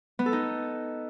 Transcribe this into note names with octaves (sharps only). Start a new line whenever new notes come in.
B3
A4
D#4